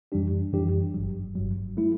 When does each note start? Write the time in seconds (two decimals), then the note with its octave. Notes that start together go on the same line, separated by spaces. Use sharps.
0.12 F#2 E3 G3 D4 G4
0.53 F#2 E3 G3 D4 G4
0.94 G1 G2 F#3
1.35 G1 G2 F#3
1.77 F#3 A3 E4